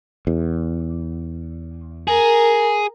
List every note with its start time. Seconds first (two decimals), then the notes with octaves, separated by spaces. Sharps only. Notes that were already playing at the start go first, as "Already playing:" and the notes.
0.27 E2
2.08 G#4 A#4